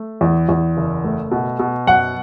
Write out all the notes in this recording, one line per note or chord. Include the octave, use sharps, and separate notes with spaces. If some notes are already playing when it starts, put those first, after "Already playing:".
Already playing: A3
E2
E2
F#1
A3
B2
B2
F#2 F#5